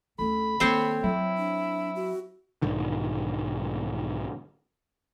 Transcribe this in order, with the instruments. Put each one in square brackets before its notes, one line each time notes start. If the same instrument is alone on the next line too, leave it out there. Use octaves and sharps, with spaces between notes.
[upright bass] D2 C#4 [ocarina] A4 [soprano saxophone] B5
[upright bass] D#3 A#3 [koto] C4 C5 C#5 [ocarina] A4
[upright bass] F#3 [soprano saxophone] E4
[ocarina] D4
F#4
[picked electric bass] B1 G#2 D3 D#3